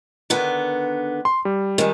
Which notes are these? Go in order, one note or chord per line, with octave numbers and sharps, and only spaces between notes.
D3 D#3 B3
C6
G3
D#3 G#3